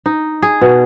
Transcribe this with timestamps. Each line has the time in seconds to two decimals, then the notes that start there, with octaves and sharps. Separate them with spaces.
0.06 D#4
0.42 G#4
0.61 B2